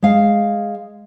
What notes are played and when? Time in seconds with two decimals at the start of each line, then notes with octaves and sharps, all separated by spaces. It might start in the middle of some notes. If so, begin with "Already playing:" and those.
0.03 G#3 F5